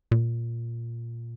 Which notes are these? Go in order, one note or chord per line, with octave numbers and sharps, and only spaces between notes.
A#2